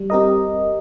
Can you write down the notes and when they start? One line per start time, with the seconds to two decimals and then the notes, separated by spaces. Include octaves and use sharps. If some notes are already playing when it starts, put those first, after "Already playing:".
Already playing: G3
0.10 C4 G4 A#4 D#5